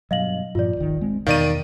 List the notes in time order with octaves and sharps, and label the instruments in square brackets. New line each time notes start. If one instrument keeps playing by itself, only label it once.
[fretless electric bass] G2 B2 F#3 [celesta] D#5 F5 F#7
[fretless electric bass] G2 A#2 F3 [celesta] F4 D5
[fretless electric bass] D#1 G#1 D#3
G#3 C4
[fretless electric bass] E2 B2 [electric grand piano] D#3 D5 D#7 [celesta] F5